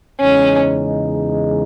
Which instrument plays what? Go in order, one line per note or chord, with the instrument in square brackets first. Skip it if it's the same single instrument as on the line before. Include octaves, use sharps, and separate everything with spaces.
[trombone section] E2 C#3 G#3 D#4 [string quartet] C#4